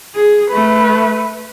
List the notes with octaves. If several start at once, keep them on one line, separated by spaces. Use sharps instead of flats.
G#4
A3 B4